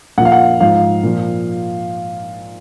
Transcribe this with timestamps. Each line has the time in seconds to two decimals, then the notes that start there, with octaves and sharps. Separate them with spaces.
0.18 A#2 F#5
0.21 F3 F5
0.32 F#5
0.60 G#2 F3 F5
1.03 A#2 F3